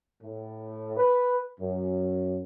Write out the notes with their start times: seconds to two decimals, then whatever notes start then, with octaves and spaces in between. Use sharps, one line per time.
0.22 A2
0.97 B4
1.60 F#2